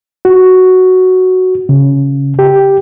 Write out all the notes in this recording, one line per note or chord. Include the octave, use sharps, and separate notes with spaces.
F#4
C#3
G4